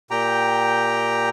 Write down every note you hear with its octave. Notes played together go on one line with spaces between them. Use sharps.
A#2 G4 G5 A#5